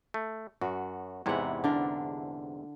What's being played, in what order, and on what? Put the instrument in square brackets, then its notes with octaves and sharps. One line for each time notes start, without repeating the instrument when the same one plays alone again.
[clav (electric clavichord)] A3
[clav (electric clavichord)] F#2 [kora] F#4
[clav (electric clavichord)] E2 G#2 C3 [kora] E4 C#5 F#5
[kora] D3 D4 A#4